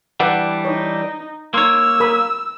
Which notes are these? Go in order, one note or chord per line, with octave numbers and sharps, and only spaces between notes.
E3 G3 D4 B4 E5 F#5
D#4 C#5
A#3 D#4 C#5 A#5 C6 E6
A#4 B5 D#6